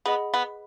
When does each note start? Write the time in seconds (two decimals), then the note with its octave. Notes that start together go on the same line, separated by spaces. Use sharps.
0.05 B3 G#4 D#5 F#5 B5
0.34 B3